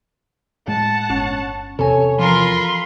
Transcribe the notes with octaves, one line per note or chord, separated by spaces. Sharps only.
A2 G#3 F#5 A5
G1 C#4 C#6
E2 C3 A4 C#5 G#5
E3 F3 F4 A#4 B5 C6